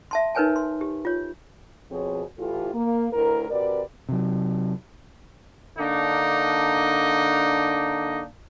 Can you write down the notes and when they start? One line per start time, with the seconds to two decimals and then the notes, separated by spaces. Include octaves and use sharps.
0.11 E5 A5 C6
0.35 D#4 A#4 B4 C#5 G#5 A5
0.56 C6
0.81 G4
1.05 F4 C#5
1.91 F2 B2 F3 C4 G#4 C#5
2.38 A2 E3 E4 F4 G4 A4
2.74 A#3
3.13 D2 A2 E4 A#4
3.50 C3 F#4 A#4 B4 D5
4.09 C3 F#3
5.77 D3 A#3 D4 D#4